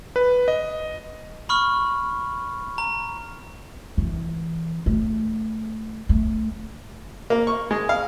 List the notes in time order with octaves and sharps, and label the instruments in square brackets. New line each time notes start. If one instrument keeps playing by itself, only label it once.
[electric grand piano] B4
D#5
[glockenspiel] B5 C#6 F6
A#5
[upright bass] E3
A3
A3
[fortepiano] A#3
C#6
G#3
F5